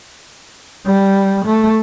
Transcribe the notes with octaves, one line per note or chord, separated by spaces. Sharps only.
G3
A3